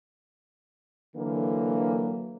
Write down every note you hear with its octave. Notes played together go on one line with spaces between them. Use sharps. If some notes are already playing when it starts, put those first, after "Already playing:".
D3 E3 F#3 A#3